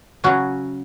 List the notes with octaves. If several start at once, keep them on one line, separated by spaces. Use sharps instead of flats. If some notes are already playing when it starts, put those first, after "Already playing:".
C#3 F#3 C#4 F#4